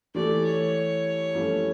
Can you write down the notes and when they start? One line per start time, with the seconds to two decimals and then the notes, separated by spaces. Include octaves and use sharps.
0.14 E3 A3 E4 G4 D5
0.45 C#5
1.35 G2 F3 A3 C#4 E4